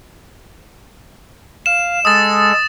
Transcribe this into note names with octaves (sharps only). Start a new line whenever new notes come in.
F5 E7
G#3 A4 D#6 A6